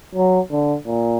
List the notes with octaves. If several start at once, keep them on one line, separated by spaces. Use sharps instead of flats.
F#3
D3
A#2